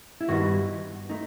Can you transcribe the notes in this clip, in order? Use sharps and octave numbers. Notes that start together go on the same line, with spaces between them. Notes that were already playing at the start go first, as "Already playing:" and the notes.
E4
G2 D#3 G3 B3 D#4 F#4
A3 D#4